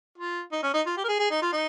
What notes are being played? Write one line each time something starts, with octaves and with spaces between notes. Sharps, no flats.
F4
D#4
C#4
D#4
F4
G4
A#4
G#4
G#4
D#4
F4
D#4